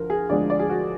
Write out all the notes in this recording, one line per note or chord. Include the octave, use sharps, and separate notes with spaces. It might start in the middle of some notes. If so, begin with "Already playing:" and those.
Already playing: D2 F3 A#4
G#4
D2 D3 F3 G#3 D5
D5
G#4
F#4